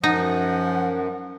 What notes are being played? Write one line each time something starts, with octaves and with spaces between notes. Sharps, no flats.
F#2 F3 D#4 F#5